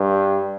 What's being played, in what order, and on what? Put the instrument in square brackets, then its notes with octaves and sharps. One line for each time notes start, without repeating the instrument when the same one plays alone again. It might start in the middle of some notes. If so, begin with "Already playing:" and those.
Already playing: [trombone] G2